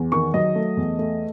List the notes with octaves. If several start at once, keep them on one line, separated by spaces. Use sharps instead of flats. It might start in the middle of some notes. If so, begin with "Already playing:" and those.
Already playing: E2
D#3 C#6
F#3 D#5
A3
E2
A3